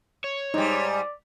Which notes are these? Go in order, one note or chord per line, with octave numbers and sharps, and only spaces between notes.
C#5
G#2 G3 D#4 D5